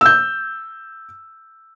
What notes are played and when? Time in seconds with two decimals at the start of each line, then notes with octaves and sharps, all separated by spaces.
0.01 E6 G6